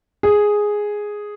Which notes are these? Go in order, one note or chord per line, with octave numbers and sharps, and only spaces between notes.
G#4